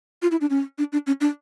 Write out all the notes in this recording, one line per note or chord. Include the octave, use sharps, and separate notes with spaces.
F4
E4
D4
C#4
D4
D4
C#4
D4